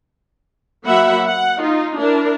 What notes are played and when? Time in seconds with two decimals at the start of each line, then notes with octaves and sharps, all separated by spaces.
0.86 F#3 A#3 E5 F#5 B5
1.27 F#5
1.60 D#4 F4
1.99 D4 E4 A#4